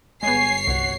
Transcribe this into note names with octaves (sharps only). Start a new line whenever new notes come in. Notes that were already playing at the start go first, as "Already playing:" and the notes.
G1 G#3 B3 C#5 G#5 C7
C2 F#4